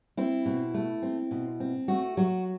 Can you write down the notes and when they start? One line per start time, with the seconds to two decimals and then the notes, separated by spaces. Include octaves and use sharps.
0.17 C4 E4
0.46 B2
0.74 A3
1.02 C4
1.31 B2
1.60 C4
1.88 A3 F#4
2.17 F#3 F#4